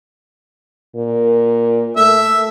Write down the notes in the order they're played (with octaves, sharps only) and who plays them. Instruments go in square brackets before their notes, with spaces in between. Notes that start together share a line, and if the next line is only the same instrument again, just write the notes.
[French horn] A#2
[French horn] A3 [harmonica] E5